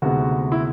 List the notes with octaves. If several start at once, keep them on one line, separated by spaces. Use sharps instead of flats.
D2 C3 D#3 G#3 B3 F#4
E4